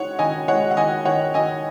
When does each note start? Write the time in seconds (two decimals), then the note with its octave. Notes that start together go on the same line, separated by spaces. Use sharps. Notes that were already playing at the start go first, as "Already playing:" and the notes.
Already playing: G#3 D#4 C#5 F#5
0.19 D#3 D#5 G#5
0.48 G#3 C#5 F#5
0.71 F#5
0.76 D#3 D#5 G#5
1.05 D#3 C#5 F#5
1.34 D#3 D#5 G#5